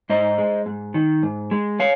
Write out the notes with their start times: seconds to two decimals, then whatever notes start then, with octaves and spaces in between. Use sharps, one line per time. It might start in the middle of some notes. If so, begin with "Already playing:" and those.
0.10 G#2 C5 D#5
0.38 G#3
0.66 G#2
0.94 D#3
1.23 G#2
1.51 G#3
1.80 C#5 F5